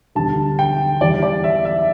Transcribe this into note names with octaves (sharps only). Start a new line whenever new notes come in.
E1 D2 D3 G3 A5
G5
E2 E3 G3 D5
D5
E5
E5